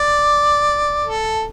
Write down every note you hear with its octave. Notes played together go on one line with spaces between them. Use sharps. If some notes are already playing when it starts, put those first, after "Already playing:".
Already playing: D5
A4